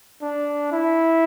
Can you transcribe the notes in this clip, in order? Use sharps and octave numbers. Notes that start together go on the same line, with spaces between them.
D4
E4